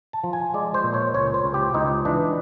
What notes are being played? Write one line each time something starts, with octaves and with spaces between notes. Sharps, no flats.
A5
F3
G#5
G#3 D5
C5
A#2
C#5
C#2 C#5
C5
C#2
G4
C#2 D#4
E3 D4